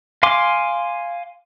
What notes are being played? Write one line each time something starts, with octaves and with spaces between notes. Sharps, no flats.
F5 G#5 C6 D6